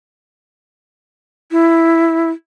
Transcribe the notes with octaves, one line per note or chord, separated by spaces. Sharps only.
E4